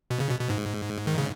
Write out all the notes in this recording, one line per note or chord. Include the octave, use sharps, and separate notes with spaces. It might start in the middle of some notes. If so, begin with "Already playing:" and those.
B2
C#3
B2
B2
G#2
D#3
C#3